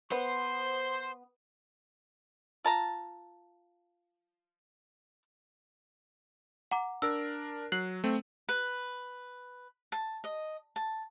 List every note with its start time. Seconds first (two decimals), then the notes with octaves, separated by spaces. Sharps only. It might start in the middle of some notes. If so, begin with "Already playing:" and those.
0.12 B3 C5 C6
2.64 F4 A5 A#5
6.71 F#5 A#5 D6
7.02 D4 A#4 E6
7.72 F#3 F#6 C7 F#7
8.04 A3 C4
8.49 B4
9.92 A5
10.24 D#5
10.76 A5